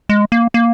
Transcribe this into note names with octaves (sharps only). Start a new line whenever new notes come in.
G#3
A#3
A#3